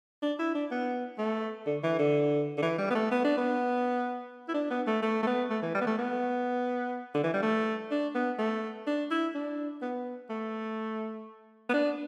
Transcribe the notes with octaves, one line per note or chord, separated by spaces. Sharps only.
D4
E4
D4
B3
A3
D3
E3
D3
D3
E3
G3
B3
A3
B3
D4
B3
E4
D4
B3
A3
A3
A3
B3
A3
E3
G3
B3
A3
B3
D3
E3
G3
A3
D4
B3
A3
D4
E4
D4
B3
A3
B3
D4